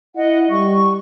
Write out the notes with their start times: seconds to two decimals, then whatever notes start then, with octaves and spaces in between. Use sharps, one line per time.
0.16 E4 D#5 F#5
0.50 G3 C#6